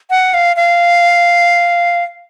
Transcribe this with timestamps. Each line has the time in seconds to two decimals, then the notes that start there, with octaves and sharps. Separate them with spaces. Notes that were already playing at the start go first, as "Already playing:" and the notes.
0.10 F#5
0.34 F5
0.56 F5